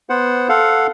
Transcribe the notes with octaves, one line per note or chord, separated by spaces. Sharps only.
B3 C5 F#5
A4 F5 F#5